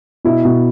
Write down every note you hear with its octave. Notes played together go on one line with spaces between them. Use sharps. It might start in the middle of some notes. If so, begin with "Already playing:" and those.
B2 E4
B2